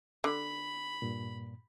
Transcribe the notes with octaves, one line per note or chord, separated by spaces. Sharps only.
D3 B5
G2 A#2